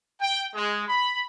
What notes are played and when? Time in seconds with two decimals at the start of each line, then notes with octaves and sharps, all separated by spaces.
0.21 G5
0.55 G#3
0.88 B5